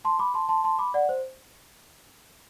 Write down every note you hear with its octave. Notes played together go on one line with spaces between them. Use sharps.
A5 C6
B5 D6
A5 C6
A5 C6
A5 C6
B5 D6
D5 F#5
C5